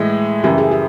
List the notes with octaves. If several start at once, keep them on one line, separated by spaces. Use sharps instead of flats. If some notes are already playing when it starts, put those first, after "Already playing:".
Already playing: A2 E3 G#3 G#4
F#2 C#3 E3 G4
G#4
G4